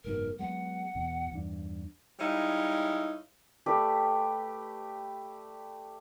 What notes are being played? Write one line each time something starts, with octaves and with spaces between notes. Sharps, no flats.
F#1 G#2 B2 A#4
F#3 G#3 B3 F#5
E2 B2
E2 G2 D4
G3 G#3 D#4 E4 C#5 F5
A3 G4 B4 D5